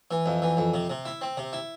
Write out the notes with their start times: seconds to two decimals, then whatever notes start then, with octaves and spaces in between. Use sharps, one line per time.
0.11 E3
0.26 F2
0.42 E3
0.57 F2
0.74 C3
0.90 C3
1.05 E4
1.21 C4
1.37 C3
1.53 E4